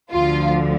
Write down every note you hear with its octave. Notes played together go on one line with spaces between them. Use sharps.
D2 D3 F3 F4